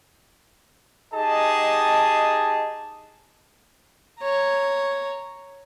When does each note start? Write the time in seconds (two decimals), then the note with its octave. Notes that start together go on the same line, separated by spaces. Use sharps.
1.14 D#4 G4 G#4 D#5 A5
4.21 C#5 A#5